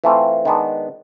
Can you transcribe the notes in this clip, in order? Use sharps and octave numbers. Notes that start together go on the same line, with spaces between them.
E3 A3 C4 F4
D#3 G#3 B3 D4